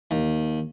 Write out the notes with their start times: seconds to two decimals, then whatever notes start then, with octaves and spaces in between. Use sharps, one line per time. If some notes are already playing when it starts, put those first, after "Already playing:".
0.11 D#2